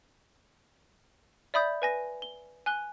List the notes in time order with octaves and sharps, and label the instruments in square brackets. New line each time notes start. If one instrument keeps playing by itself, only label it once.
[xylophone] D5 E5 B5 D#6 G6
B4 G#5 A#6
G7
G#5 F#6 G7